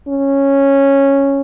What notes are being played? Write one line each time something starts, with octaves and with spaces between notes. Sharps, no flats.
C#4